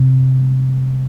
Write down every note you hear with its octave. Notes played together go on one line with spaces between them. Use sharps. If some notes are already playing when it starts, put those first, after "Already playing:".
Already playing: C3